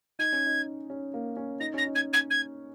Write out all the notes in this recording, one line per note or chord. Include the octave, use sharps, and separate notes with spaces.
D#4 G#6
C#4
D#4
C#4
A#3
C#4
D#4 A#6
C#4 A#6
D#4
G#6
G#6
G#6